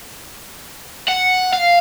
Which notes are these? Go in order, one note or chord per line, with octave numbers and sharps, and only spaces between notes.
F#5
F5